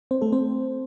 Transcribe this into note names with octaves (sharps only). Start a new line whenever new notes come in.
C4 C5
A3 A4
C4 C5